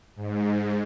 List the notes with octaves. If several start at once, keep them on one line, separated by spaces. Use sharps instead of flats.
G#2